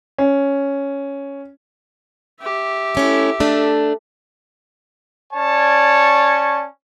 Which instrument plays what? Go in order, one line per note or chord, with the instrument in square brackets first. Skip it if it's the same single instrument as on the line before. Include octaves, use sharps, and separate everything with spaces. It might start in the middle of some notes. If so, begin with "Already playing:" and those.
[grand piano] C#4
[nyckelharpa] G4 E5
[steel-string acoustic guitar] A3 C#4 E4
A3 D4
[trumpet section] C#4 C#5 D5 A5